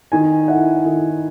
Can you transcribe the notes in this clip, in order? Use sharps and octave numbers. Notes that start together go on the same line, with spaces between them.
D#3 G#5
E4 F#5
D#3